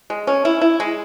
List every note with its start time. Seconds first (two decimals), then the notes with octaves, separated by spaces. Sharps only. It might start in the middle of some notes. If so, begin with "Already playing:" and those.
0.10 G#3
0.27 C#4
0.45 E4
0.61 E4
0.80 G#3